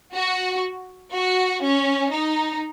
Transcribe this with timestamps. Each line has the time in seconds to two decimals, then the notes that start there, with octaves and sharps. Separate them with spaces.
0.15 F#4
1.13 F#4
1.63 C#4
2.12 D#4